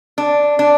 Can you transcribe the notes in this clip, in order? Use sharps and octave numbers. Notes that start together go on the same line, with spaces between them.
D4
D4